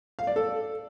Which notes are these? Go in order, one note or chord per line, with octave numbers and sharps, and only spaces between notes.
F5
D5
A4